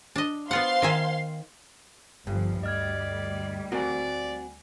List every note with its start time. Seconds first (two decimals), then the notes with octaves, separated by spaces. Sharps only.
0.16 D4 D#5
0.51 B3 F4 C5 F5 F#5 C6
0.82 D#3 E5 G#5
2.27 G1 G2 F3
2.63 D2 G3 D5 D#5 F6 G#6
3.72 C4 F#4 A#4 D5 F#5 G#5